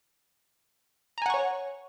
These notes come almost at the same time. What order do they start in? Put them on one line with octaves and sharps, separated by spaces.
A#5 G#5 F#5 C#6 C#5